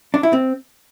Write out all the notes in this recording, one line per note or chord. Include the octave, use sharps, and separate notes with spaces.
D4
E4
C4